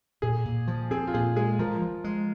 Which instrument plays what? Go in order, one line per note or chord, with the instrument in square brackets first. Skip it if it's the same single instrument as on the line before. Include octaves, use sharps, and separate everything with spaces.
[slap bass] A#2 [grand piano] G#4
[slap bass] A#2
F3
[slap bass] C4 [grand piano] G#4
[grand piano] F4
[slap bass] A#2 [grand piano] G#4
[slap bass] G#3 [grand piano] G#4
[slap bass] F3 [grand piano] F4 A#4
[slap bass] F3
G#3